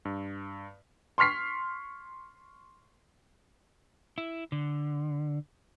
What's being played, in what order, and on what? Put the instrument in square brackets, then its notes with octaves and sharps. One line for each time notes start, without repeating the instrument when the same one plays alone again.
[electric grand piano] G2
[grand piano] C6 C#6 F6 B6 C7
[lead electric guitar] E4
D3